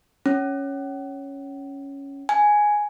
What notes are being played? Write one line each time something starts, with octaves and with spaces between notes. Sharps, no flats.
C#4
G#5